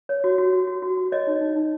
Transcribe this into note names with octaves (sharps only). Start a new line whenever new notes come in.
C#5
F#4
F#4
F#4
F#4
F#4
F#4
C#5 D#5
D#4
D#4
D#4